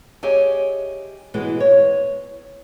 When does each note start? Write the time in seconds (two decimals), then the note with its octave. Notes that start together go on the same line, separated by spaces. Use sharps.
0.23 G4 G#4 C#5 D#5 E5 G#5
1.34 B2 E3 G#3
1.60 C#5